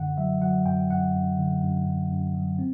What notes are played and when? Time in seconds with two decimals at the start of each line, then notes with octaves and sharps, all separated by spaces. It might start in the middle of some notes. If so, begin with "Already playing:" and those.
Already playing: F#2 D3 F#5
0.18 F#3 E5
0.42 F#3 F#5
0.65 F#2 G5
0.89 F#2 F#5
1.14 F#2
1.38 D3
1.62 F#2
1.86 F#2
2.11 F#2
2.34 F#3
2.59 C4